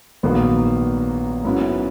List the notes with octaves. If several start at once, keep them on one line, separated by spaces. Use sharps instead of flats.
A#1 G#2 D#3 F#3 A#3 B3
G#2 F#3 B3 C#4 E4